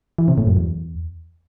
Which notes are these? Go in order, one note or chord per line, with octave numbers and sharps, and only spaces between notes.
E3
C3
A2
F#2
E2